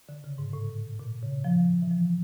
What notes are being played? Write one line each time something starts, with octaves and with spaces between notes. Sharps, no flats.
D3
C#3
G#2
A2
A#2
C#3
F3
E3
F3